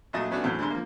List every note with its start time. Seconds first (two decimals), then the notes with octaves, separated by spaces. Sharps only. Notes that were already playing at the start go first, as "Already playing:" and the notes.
0.13 A#1 F#3 A3 D#5 A5 D#6
0.31 F#3 A3 B3 C#4 D4 F#4
0.44 E2 A2 F#3 C4
0.59 D3 G3 G#3 C6
0.70 F3 A#3